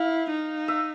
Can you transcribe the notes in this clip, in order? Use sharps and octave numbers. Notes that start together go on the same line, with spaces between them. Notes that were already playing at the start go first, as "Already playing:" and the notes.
Already playing: E4 F5
D#4
E5